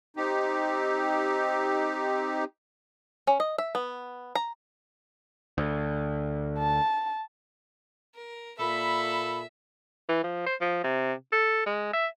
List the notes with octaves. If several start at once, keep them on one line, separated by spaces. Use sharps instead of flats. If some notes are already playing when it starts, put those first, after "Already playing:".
C4 D#4 G4
C#4
D#5
E5
B3
A#5
D2
A5
A#4
A#2 A4 E5 B5
E3
F3
C5
F3
C3
A4
G#3
E5